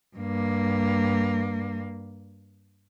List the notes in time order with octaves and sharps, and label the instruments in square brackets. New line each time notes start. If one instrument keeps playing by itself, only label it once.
[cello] G2 A#3